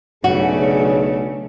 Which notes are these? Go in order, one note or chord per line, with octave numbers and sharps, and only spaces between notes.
B1 C#3 A3 D4 F#4 G#4 C#5